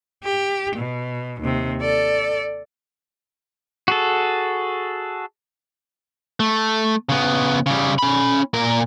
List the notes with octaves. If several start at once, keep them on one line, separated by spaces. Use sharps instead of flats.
G4
B2
D#2 C3
A4 D5
F#4 G#4 A4
A3
C#3 B3
C#3 G3
C#4 B5
A#2 A#4